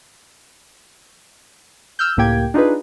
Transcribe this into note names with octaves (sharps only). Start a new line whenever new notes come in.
E6 F6 G6
C#2 A2 A#3 G4 G5 G#6
D4 D#4 F4 G#4 B4